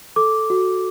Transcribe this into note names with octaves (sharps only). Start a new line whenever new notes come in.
A4 D6
F#4